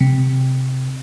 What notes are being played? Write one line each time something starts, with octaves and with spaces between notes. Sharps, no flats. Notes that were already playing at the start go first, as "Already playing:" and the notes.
C3